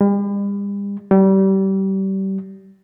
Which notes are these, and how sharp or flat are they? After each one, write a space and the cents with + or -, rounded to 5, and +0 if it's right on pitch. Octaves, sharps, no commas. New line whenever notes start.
G3 +40
G3 -30